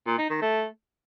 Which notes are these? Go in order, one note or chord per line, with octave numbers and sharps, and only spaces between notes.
A#2
D#4
D#3
A3